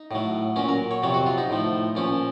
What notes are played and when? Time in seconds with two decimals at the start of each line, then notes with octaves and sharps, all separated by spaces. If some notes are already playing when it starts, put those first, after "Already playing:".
Already playing: D#4
0.11 A2 F#3
0.56 A#2 F#3 C#4
0.69 A#4
0.91 C#5
1.02 F2 C3 F#3 C#5
1.14 F#4
1.26 F4
1.38 D#4
1.50 A2 F3
1.95 A#2 F3 C#4